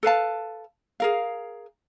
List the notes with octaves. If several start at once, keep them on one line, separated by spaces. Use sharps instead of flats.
A4 B4 F5 A5
G#4 A#4 F5